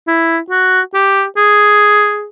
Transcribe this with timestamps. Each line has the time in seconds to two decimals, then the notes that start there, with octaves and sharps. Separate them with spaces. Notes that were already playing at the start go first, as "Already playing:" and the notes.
0.08 E4
0.51 F#4
0.94 G4
1.37 G#4